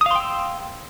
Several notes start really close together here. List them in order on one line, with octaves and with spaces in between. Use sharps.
D#6 F5 C6 G5 E6